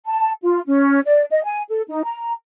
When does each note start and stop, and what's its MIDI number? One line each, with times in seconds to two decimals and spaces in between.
0.06 0.32 81
0.42 0.61 65
0.66 1.00 61
1.06 1.23 74
1.31 1.40 75
1.45 1.62 80
1.69 1.82 69
1.88 2.02 63
2.03 2.32 82